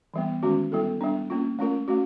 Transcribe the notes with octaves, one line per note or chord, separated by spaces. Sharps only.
E3 G3 B3
D#3 G#3 C#4 F#4
G3 B3 E4 A4
G3 B3 D4
A#3 C#4 F4
A3 C#4 F4 A#4
A3 C#4 F#4